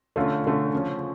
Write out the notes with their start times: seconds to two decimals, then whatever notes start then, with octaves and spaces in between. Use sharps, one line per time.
0.16 D3 A3 C#4 F4
0.45 D3 A3 C#4 F4
0.73 C#3 F3 C#4